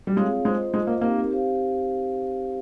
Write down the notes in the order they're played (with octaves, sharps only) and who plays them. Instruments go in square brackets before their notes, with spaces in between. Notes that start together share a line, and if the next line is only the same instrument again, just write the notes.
[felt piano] G3
[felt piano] G#3 [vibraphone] C4 F4 G#4 C#5 F5
[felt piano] G#3 [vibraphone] F4 C5 D#5
[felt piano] G#3 [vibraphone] F4 C5 D#5
[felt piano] A#3
[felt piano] A#3 [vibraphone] C4 D#4 G4 A#4
[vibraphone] C4 G4 C5 F5